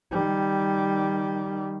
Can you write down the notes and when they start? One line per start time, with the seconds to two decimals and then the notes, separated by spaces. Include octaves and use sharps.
0.12 D#3 G3